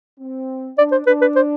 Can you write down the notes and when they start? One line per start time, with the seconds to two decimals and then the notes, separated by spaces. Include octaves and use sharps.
0.19 C4
0.78 D4 D5
0.92 C5
1.07 D4 B4
1.22 B4
1.36 C5